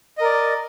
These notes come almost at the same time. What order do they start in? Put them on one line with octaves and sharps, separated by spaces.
D#5 A#4 D5